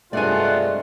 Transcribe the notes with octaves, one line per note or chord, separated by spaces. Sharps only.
G2 C3 G#3 A3 F4 D5 F#5 G#5